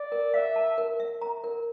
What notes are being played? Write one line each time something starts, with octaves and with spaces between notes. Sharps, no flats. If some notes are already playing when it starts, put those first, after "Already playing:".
Already playing: D5
A#4
E5 F5
A5
A#4
E5
A#5
A#4